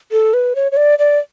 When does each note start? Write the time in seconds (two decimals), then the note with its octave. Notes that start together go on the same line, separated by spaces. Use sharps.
0.12 A4
0.34 B4
0.56 C#5
0.72 C#5
0.77 D5
0.99 D5